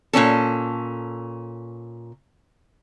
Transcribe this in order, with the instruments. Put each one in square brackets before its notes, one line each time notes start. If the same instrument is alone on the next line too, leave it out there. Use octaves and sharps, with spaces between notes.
[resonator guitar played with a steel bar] A#2 D#3 C#4 A4